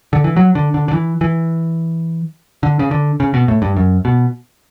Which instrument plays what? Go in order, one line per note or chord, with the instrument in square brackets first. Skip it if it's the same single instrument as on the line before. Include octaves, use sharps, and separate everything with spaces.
[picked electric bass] D3
E3
F#3
D3
D3
D3
E3
E3
D3
C#3
D3
C#3
B2
A2
G2
F#2
B2